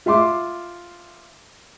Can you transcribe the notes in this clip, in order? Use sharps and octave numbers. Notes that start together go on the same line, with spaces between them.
F4 E5 C6 D6